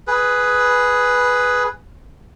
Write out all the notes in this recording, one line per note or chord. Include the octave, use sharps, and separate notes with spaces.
G#4 B4